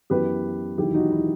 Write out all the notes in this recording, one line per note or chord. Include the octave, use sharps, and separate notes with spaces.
F#2 E3 B3 G4 B4
E1 D#2 D#3 F#3 E4 G4
D#4 F#4
E4